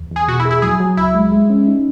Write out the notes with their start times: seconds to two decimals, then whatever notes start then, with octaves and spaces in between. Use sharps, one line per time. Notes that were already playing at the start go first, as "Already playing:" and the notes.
Already playing: E2
0.11 E2
0.16 G#4
0.28 B2 F#4
0.40 E4
0.45 G#4
0.51 E4
0.62 F#3 G#4
0.80 F#3
0.97 C#2 E4
1.14 G#3
1.32 G#3
1.50 C#4
1.67 D#4